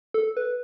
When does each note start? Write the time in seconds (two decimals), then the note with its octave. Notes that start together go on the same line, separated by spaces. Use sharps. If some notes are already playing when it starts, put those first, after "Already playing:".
0.14 A4
0.37 B4